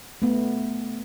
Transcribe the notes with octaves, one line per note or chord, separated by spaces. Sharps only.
A3 B3